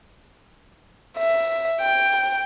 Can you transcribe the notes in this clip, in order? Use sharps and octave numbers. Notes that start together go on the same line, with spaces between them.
E5
G5